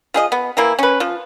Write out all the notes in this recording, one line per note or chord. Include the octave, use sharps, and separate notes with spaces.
F3 G#4 D#5
B3
E3 A#3 E4
C#4 B4
F3